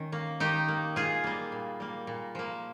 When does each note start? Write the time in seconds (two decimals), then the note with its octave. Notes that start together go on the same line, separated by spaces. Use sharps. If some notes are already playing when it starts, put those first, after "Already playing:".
Already playing: D#3 C#4
0.12 A#3
0.40 D#3 D#4 G4
0.68 A#3
0.96 A#2 F4 G#4
1.24 G3 A#3
1.52 A#2
1.80 G3 A#3
2.07 A#2
2.35 F3 A#3